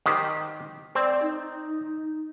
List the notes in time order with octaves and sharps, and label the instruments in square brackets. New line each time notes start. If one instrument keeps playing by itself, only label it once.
[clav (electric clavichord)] D#3 G4 C5
[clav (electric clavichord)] C4 [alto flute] D5
[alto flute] D#4